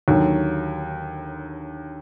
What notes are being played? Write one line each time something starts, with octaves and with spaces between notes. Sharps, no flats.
D#2 D3 F#3